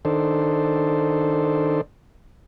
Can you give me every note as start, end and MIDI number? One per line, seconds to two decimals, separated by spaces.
0.05 1.81 51
0.05 1.81 62
0.05 1.81 69
0.05 1.81 72